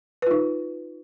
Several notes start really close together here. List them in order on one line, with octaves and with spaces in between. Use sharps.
B4 F4 D#4